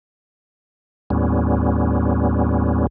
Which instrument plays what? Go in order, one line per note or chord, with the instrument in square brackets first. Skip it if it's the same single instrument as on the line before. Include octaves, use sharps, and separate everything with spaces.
[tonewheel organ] D#2 A2 G3 B3 C#4